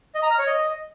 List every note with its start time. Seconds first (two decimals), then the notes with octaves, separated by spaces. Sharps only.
0.15 D#5
0.23 A#5
0.31 F6
0.39 C#5
0.47 D#5